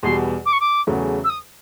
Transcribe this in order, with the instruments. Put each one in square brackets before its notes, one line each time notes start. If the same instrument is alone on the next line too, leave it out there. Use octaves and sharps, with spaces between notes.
[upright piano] E2 B2 G3 [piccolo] C6
[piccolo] D6
C#6
D6
[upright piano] E2 C#3 F#3 A3
[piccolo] E6
D#6